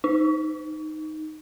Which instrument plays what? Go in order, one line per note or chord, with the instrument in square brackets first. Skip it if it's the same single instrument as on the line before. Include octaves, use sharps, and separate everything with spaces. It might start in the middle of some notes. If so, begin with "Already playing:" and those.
[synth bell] D#4